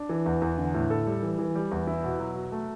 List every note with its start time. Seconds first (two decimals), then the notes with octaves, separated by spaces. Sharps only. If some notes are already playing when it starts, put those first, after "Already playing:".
Already playing: D4
0.09 E3
0.26 E2
0.42 E2
0.58 D3
0.74 A2
0.90 A4
1.07 G3
1.23 E3
1.39 E3
1.55 G3
1.71 E2
1.87 E4
2.04 B2
2.20 F#3
2.36 F#4
2.52 A3